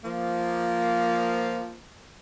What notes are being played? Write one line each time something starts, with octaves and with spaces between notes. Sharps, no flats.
F3 A#3